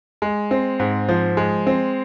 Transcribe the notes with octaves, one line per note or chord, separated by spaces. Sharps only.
G#3
C4
G#2
F3
G#3
C4